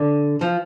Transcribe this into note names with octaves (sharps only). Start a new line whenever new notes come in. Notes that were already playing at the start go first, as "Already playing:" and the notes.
Already playing: D3
F3